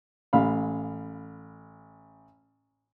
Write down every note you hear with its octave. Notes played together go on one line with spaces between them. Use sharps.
A1 F5 B5